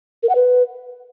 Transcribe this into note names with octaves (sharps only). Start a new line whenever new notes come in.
A#4
F#5
B4